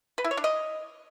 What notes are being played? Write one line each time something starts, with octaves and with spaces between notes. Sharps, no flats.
B4
E4
C#5
D4
D#5